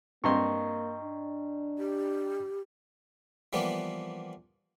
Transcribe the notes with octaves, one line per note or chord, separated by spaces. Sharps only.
G2 A#3 C4 D#5 A#5 C6 C#6
D4
G4
E3 F3 G3 A#3 B3